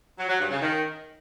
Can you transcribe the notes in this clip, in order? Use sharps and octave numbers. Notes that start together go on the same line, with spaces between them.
F#3
F#3
G2
C#3
D#3